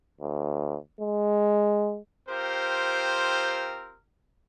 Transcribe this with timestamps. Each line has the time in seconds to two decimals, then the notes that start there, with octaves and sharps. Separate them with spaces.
0.21 D2
1.01 G#3
2.29 C4 F4 G4 A#4 C5